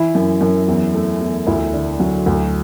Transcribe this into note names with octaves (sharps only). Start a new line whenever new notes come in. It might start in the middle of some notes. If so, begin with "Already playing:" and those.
Already playing: E3 E4
F#2
F#2
E2
A3
E2
D2 E4
D3
F#3
D2